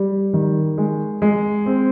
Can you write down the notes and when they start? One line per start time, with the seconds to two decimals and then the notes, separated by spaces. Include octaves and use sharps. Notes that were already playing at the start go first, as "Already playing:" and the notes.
Already playing: G3
0.33 D#3
0.78 G#3
1.22 G#3
1.66 C4